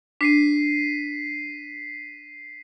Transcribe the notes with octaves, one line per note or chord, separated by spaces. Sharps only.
D4 B6 C7 D#7